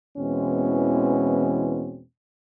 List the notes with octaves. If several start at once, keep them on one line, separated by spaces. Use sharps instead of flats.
E2 B2 E3 G#3 C4 C#4